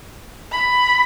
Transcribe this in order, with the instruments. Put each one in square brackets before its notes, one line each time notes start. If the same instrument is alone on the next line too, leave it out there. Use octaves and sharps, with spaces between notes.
[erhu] B5